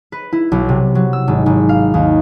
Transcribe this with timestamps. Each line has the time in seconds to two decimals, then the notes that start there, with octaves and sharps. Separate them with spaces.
0.12 B4
0.33 E4
0.52 B1
0.69 C3
0.95 F#3
1.13 E6
1.28 G#1
1.46 G#1
1.69 F5
1.94 D#2